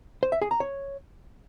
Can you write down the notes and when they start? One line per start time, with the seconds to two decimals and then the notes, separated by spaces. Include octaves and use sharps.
0.23 C5
0.32 E5
0.42 G#4
0.51 A#5
0.60 C#5